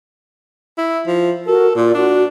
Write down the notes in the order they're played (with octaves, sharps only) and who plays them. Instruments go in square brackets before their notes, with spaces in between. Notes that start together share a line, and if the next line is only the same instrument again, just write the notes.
[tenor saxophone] E4
F3
[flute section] F#4 A#4 [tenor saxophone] A4
[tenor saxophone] A#2 [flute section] F4 D5
[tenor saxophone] D4 [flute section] F#4